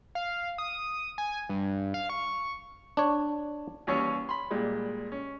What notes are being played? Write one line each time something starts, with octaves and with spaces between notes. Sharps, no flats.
F5
D#6
G#5
G2
F5
C#6
D4 C#5
D#2 E3 G3 C#4 C#5
B5 C6
A#2 G3 G#3
C#4